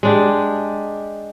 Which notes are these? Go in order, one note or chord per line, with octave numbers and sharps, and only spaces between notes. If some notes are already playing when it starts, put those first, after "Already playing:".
G#3 D4 G4